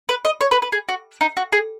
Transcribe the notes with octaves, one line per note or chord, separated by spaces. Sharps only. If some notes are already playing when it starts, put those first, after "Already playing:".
B4
D#5
C#5
B4
B4
G#4
F#4
D#4
F#4
G#4